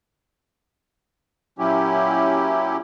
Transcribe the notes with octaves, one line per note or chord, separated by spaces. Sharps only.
A#2 F#3 C#4 E4 G4